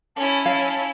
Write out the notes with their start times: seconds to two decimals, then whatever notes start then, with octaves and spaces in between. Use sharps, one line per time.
0.16 C#4 E4 A5
0.46 F5